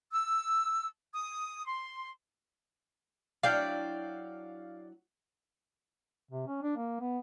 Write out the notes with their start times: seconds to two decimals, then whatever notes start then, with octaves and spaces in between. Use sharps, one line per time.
0.13 E6
1.12 D#6
1.66 C6
3.43 F#3 D4 E4 D5 F5 G5
6.31 C3
6.47 C#4
6.63 D4
6.77 A#3
7.00 B3